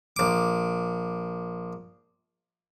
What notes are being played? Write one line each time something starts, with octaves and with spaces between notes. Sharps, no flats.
A#1 D6